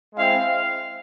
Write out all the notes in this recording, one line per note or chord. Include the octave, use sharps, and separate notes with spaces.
G#3 C4 E4 F5